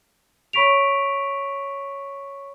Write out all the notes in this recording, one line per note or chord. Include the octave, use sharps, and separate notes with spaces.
C#5 B5 C#6 B6 D7 F7